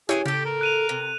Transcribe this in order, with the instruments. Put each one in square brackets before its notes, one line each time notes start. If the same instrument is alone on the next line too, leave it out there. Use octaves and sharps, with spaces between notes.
[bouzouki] E3 C#4 G#5 [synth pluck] E4 G4 C#5 [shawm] G#4
[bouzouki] A2 A4 [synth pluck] C#3 [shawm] G4
[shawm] A#4
[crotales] F#6 D#7 F7
[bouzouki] C3